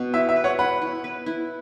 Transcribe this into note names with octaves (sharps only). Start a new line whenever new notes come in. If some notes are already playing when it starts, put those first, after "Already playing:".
Already playing: B2
E4 E5
E5
B4
C#5 F#5
B4 F#5 B5
E4
B4
E4